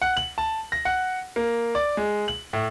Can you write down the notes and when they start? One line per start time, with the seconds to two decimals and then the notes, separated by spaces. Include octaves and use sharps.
0.02 F#5
0.17 F#7
0.38 A5
0.72 A#6
0.85 F#5
1.36 A#3
1.75 D5
1.97 G#3
2.28 F#7
2.53 A2